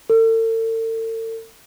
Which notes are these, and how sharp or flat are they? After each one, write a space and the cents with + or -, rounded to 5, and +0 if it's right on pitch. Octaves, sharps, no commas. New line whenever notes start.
A4 +40